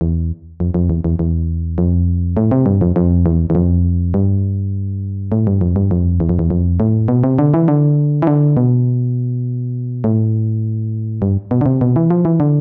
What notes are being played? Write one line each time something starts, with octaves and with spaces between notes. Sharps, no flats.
E2
F2
F2
E2
E2
E2
F2
A2
C3
G2
F2
F2
E2
E2
F2
G2
A2
G2
F2
G2
F2
E2
F2
E2
F2
A2
B2
C3
D3
E3
D3
E3
D3
B2
A2
G2
B2
D3
C3
B2
E3
F3
E3
D3